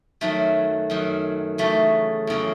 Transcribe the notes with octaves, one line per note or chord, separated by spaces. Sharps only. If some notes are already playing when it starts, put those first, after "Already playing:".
F#2 D#3 F#3 A3
F#2 D#3 F#3
E2 C#3 F#3 A3
E2 C#3 F#3